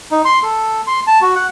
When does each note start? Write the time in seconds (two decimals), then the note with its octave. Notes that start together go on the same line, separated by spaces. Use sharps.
0.11 D#4
0.25 C6
0.43 A4
0.87 C6
1.07 A5
1.22 F#4
1.36 F#5